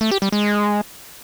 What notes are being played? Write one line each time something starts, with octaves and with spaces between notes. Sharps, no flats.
A3
G4
G3
G#3